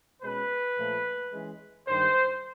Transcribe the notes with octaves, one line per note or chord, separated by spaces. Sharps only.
B2 G#3 C#4 B4
A#2 F3 A3
E3 G#3 C#4
G2 D#3 G3 C5